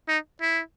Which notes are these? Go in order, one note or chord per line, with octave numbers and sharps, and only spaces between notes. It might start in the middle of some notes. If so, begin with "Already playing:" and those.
D#4
E4